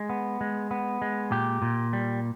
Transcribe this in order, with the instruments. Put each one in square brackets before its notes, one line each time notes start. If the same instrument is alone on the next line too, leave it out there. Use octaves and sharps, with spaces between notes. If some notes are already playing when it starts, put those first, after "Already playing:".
Already playing: [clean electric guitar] G#3
B3
G#3
B3
G#3
A#2 G4
A#2
G3